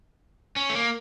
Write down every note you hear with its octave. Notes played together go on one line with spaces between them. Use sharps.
C#4
A3
A#3